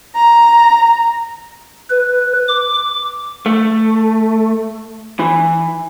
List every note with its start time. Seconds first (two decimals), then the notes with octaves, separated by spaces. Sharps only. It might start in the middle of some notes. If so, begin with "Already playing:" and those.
0.15 A#5
1.90 B4
2.48 D6
3.46 A3
5.19 E3